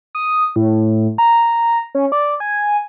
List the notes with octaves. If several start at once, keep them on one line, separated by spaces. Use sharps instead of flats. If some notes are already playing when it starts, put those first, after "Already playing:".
D#6
A2
A#5
C#4
D5
G#5